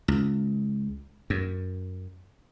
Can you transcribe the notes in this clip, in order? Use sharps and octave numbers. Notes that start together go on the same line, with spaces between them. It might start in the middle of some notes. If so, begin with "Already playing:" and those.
C#2
F#2